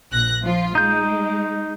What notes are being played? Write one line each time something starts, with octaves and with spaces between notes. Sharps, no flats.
A#1 F#6 A#6
F3 F4
G#3 D#4 G6